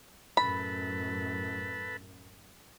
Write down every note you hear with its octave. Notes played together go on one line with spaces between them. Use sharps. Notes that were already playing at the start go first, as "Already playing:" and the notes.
F#2 A2 A4 B4 B5